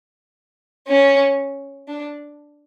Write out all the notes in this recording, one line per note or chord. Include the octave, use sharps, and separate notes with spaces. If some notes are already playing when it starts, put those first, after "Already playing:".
C#4
D4